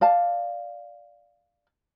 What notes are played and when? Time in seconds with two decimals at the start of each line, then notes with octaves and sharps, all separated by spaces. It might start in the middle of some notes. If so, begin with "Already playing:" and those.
0.01 D5 F5 A5